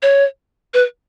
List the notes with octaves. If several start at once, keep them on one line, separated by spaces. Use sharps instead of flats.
C#5
B4